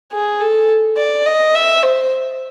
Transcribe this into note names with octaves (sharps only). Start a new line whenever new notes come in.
G#4
A4
D5
D#5
E5
C5